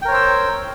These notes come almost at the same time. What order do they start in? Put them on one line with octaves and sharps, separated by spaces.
G5 A#4 C#5 C5 E6